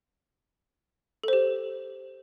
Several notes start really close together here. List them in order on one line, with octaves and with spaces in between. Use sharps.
A4 C5 G4